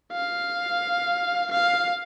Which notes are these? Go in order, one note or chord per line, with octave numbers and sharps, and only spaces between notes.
F5
F5